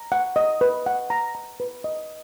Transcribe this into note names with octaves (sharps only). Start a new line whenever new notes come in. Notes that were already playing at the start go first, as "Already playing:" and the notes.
Already playing: A#5
F#5
D#5
B4
F#5
A#5
A#5
B4
D#5